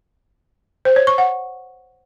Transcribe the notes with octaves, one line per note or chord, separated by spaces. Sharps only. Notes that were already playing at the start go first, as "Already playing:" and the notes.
C5
C#5
C#6
F#5